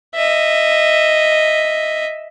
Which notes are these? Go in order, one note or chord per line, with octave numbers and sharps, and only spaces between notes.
D#5 E5